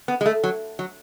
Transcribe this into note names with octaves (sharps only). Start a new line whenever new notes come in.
B3
G#3
A3
F#3
F#3